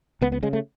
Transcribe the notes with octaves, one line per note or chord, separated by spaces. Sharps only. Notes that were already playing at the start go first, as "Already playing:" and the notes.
C#2 B3
B3
C#3 G#3
A3